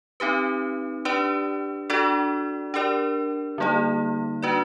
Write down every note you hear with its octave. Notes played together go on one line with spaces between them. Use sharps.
C4 D#4 G4 B4
D4 G4 B4 D5
D4 F#4 A4 D5
D4 G4 A#4 D5
D3 G3 A#3 D#4 G#4
D4 F#4 B4 D5